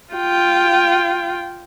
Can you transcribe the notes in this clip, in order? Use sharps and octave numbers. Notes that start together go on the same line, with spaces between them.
F4 G5